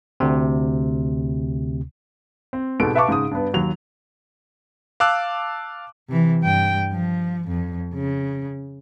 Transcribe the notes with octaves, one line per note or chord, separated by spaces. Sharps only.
D2 C3
C4
G#2 B2 G4 A4 D7
B4 E5 F5 A5 C#6 D6
G#2 C#3 D#6
G2 B3
D#2 F#3 F7
F5 A5 D6 E6 F#6
C3 E3
G2 G5
F3
F2
C#3